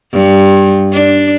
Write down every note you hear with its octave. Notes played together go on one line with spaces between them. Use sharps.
G2
D4